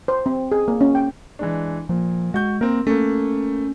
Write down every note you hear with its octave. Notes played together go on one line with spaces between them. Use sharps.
C5
C4
G#4
A#3
C#4
G5
E3 G#3 D4
A#2 F3
G#3 F#4 G6
A#3 C4 A#4
A3 A#3 C#4